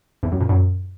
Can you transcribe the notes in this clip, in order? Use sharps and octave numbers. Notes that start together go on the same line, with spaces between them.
E2
F#2
A#2
F#2